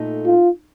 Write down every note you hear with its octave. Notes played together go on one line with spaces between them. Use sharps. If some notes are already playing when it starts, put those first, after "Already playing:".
Already playing: A#2 A3 D#4 A4
F4